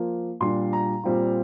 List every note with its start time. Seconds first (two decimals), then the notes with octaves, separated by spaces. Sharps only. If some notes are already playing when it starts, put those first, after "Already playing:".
Already playing: F3 A#3 F4
0.40 A#2 G3 D4 C6
0.73 A#5
1.03 A#2 G3 C4 F4